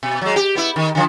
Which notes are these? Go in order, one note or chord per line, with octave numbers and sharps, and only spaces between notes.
B2
F#3 G#3
G4
B3 E4
D#3
D3 F3